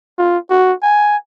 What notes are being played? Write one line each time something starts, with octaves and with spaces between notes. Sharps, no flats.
F4
F#4
G#5